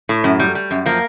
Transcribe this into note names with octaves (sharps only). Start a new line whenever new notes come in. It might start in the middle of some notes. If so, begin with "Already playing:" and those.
A2
F#2
G3
G3
F#2
F3 A#3